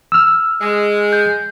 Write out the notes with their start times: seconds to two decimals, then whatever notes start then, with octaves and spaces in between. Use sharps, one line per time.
0.12 E6 F6
0.61 G#3
1.13 G6